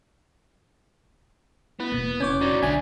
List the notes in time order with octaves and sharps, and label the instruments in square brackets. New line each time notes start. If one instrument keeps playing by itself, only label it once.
[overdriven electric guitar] B3 [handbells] E4
[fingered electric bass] E1 B2 A#3
[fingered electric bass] F1 C#3 [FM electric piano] C#4 C#5 [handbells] D6 G6 G#6
[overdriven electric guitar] D#4 F#4 [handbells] D5
[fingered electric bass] B1 D3 F3 [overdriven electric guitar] D4 E5 [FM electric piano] G#5